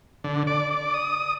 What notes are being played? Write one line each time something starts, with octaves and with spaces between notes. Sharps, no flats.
D3
D5
D5
D#6